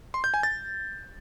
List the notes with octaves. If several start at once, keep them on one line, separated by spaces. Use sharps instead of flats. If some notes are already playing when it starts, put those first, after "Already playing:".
C6
G6
G#5
A6